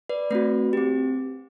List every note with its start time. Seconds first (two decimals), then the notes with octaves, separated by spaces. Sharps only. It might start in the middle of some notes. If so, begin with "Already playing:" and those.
0.09 B4 D5
0.30 A3 C4 F#4 B4
0.73 C4 G4